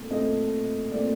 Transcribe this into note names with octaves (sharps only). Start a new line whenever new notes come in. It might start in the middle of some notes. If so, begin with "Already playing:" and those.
Already playing: A#2 A3 C4
A#2 A3 C4 D#5
A#2 A3 C4 D5